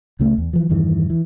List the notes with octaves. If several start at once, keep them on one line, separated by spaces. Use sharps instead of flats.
C#2 C#3 A3
E2
E3 F3
E2 G2 D#3 E3
E3